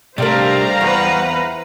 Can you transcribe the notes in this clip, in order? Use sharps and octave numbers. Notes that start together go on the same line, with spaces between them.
C3 G3 A3 D4 A#4 C5 F5 A#5
E2 B4 F#5